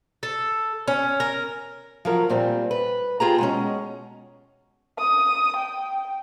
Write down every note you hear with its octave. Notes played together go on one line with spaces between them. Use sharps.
A4
C#4
A#4
F3 F#3 A#4
A#2 G3 C4
B4
F4 G4 G#4 A5 A#5
B2 G#3 C#4
D#6
G5